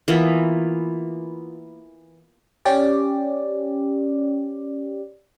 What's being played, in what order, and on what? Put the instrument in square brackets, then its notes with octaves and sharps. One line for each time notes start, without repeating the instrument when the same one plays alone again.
[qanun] E3 A#3 B3 F4
[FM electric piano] C#4 G4 D5